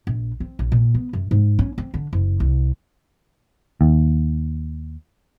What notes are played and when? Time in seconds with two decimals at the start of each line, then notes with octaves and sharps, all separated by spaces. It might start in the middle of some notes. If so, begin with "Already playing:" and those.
0.07 A#1
0.40 C4
0.59 A#1
0.72 A#2
0.94 B3
1.13 F#2
1.31 G#2
1.59 C#4
1.78 C4
1.94 D3
2.13 F#1
2.40 C2
3.81 D#2